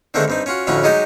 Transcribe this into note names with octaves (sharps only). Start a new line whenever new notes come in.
D3 D#3 G#3 A3 C4 D4
G2 C4 D#4
C#4 F4 F#4
F2 A2 D3 C#4 F4 F#4
F#3 G#3 D#4 G4 D#5